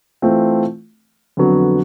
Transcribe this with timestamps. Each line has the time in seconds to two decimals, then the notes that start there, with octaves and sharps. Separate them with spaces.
0.22 E3 A3 C4 F4
1.37 F2 D3 F#3 B3